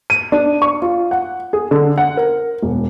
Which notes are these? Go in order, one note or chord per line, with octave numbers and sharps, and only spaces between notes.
D#7
D4
C#6
F4
F#5
G#4
D3
F#5
A#4
E1